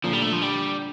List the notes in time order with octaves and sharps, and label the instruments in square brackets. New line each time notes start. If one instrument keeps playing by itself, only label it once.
[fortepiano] A#2 D3 [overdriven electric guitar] F3
[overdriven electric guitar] G3
A3
F3
G3